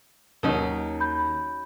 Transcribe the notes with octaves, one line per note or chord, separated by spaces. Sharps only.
D#2 F#3 C#4 D#4
B5 G6